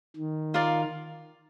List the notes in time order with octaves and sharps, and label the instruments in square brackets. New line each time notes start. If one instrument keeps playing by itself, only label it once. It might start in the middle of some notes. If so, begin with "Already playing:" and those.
[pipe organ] D#3
[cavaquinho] F4 A#4 D5 F5